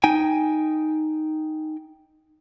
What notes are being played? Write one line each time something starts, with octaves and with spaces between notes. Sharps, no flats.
D#4 G5 G#5